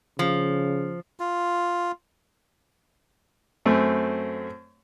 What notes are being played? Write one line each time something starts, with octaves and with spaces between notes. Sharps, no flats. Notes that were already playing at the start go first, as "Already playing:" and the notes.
C#3 F3
F4
F#2 A3 C4